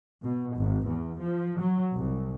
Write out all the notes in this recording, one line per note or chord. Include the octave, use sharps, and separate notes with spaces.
B2
G#1
E2
F3
F#3
C2